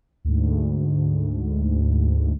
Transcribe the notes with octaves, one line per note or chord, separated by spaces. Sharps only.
D2 G#2